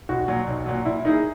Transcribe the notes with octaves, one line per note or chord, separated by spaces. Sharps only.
B1 F#4
A#2 F#3
B1
A#2 F#3
A#2 E4
A#3 D#4 E4 G#4